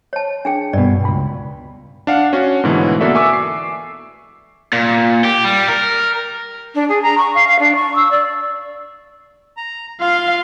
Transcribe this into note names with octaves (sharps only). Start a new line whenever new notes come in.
C#5 A5
D4 G#4 G5
G2 B2 D5
C#2 B5
D4 F5 F#5
C#4 F#4
G#2 B2 D3 E3 A3
A#3 B3 F#4 A4 D5 E5
E5 G#5 C#6 D6 E6
C7
A#2
G4
G3
A#4
D4
G#4
A#5
C#6
F5
F5
D4
C#6
E6
D5
A#5
F4 F5 C6